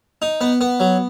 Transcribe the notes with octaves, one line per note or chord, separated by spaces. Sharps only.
D#4
B3
B3
F#3